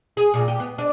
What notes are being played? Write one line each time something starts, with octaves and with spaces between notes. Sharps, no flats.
G#4
A#2
G4
B3
D4